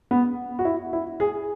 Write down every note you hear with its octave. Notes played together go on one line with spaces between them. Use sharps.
B3
F#4
E4
E4
G#4